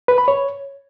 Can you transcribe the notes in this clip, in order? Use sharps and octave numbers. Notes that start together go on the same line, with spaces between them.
B4
B5
C#5